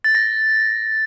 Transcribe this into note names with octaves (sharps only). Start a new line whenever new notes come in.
A6
A#6